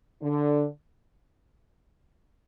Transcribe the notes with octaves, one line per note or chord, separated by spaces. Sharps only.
D3